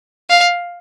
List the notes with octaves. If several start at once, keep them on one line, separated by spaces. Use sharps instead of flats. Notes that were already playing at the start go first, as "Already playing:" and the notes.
F5